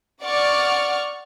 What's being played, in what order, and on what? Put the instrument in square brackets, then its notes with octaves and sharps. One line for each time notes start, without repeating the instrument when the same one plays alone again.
[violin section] D5 F#5 C#6 F6